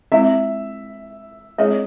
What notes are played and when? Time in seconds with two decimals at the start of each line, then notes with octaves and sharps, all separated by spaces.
0.12 G#3 C4 E4 E5
1.58 G#3 C4 E4 G#4 C#5 D#5